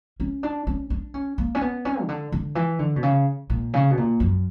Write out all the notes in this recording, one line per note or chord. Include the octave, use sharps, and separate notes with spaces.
C#4
D4
C#4
D4
C#4
A#3
C#4
B3
C#4
C#3
D3
D3
E3
D3
B2
C#3
A#2
C#3
B2
A#2
F#2